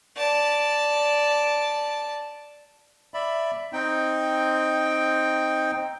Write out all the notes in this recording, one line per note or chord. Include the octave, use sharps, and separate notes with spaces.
D5 A5
D5 E5 B5
C4 D#4 G5